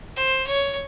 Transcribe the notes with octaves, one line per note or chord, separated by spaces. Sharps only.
C5
C#5